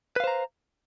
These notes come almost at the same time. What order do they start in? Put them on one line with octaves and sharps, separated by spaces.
B4 F5 C5 A#5